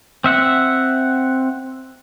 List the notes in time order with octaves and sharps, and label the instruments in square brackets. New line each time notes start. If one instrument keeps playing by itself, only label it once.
[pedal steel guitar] C4 E5 F#5